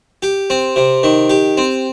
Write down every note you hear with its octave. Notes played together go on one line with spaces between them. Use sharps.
G4
C4
C3
D#3
G4
C4